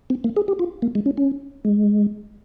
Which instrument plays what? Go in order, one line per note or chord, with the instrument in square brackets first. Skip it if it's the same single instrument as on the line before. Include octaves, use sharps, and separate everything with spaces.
[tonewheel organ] C4
A#3
G#4
G4
F4
A#3
G#3
C#4
C#4
G#3